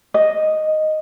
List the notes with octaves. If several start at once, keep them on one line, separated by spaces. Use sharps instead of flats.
D#5